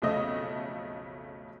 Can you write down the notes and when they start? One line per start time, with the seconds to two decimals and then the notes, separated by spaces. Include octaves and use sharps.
0.02 B1 F2 C#3 A3 D#5 D#6